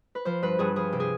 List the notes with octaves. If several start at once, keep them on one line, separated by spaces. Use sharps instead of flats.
B4
F3 C5
G2 B4
G2 G#4
F3 G#4
C3 G4
G#4